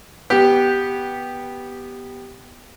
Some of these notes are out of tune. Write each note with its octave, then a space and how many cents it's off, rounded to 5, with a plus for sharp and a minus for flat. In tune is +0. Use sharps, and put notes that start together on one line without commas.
B3 -10 G4 +0